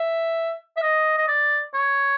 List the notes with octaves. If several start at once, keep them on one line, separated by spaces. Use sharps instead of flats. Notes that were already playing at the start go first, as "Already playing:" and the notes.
Already playing: E5
E5
D#5
D#5
D5
C#5